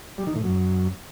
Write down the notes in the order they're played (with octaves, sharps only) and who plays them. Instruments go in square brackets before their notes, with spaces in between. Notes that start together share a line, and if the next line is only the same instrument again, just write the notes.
[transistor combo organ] G3
D#3
A2
F#2